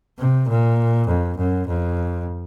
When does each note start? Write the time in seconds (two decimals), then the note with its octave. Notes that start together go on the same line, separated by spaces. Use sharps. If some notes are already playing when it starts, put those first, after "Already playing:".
0.18 C3
0.48 A#2
1.08 F2
1.38 F#2
1.67 F2